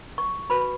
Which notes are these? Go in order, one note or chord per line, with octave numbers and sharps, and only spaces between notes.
C#6
F#4 B4 B5